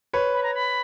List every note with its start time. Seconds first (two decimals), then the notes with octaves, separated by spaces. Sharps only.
0.13 B4 C#5
0.34 B5
0.43 A#5
0.55 B5